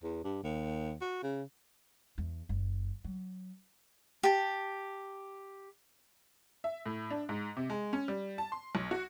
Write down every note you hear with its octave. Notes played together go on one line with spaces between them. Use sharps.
E2
G2
D#2
F#4
C#3
E2
F#1
F#3
G4 A5
E5
A2
D4
G#2
C3
G#3
C#4
G3
A5
C6
B1
F#4